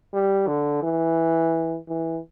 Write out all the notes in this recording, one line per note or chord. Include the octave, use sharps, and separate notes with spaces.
G3
D3
E3
E3